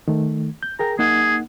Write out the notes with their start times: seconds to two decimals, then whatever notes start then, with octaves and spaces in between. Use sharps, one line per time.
0.08 D#3 A3
0.63 G6
0.79 G#4 A#4 G5 A#5
0.99 A#3 D#4 G#4 F#5